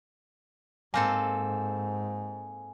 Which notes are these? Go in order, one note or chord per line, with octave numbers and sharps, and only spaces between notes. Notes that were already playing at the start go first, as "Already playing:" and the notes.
G#2 A#3 C4 A4 G#5